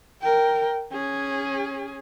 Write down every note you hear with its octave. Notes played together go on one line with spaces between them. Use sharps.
A#4 G5
C#4 G#4